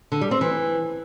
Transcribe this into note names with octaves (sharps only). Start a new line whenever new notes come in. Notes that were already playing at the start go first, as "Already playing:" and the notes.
D3
G3
C4
E3